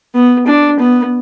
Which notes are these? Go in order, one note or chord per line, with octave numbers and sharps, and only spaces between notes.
B3
D4
B3